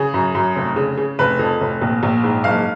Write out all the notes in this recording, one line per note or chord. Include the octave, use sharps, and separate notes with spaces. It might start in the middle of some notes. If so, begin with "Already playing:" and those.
Already playing: C#3 G#4
F#2
F#2
F1
C#3
C#3
F1 B4
F2
F1
A#1
A#1
G#2
F#1 F5